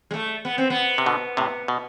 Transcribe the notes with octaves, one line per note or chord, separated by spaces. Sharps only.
G#3
A3
B3
C4
B3
C3
B2 D3
A2 C3
B2